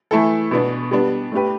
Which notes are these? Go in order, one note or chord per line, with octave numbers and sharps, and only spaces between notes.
E3 A3 E4 A4
B2 B3 D4
G3 B3 D4
A3 D4 G4 B4